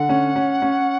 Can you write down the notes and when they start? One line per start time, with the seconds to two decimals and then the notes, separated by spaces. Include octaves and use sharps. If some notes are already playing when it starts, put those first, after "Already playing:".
Already playing: D3 F#5
0.09 C#4
0.36 C#4
0.62 C#4